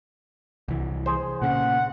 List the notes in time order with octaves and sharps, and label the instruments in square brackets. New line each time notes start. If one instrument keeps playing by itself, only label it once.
[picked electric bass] C2 E3
[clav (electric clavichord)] G#4 C5
[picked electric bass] A#2 C#3 [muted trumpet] F#5